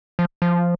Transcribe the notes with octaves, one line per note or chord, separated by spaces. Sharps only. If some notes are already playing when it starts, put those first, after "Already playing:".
F3
F3